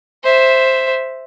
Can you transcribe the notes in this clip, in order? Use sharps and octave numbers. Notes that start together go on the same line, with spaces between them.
C5 E5